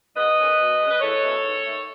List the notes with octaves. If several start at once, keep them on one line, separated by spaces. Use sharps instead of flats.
G#2 B4 D#5
D#3 G#3 C#4
B2
G#3 C#4
B4
E2 A4 C#5
B2 F#3 C#4 E4
G#2
D#3 A3